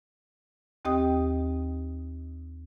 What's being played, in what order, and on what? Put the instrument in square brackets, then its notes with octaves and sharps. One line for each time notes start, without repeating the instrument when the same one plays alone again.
[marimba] D#2 C4 G4 D#5 G5 D#6